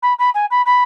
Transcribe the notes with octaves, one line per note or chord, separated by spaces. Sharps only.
B5
B5
G#5
B5
B5